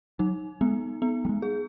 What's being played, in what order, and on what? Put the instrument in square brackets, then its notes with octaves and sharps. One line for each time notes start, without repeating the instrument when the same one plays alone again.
[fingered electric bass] F#3 [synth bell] D#4
[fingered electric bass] G#3 [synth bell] B3
[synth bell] B3
[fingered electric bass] G3
G#3
[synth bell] G#4